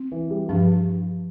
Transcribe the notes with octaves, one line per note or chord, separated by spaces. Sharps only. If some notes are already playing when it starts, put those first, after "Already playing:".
Already playing: C4
E3
G3
G2 F3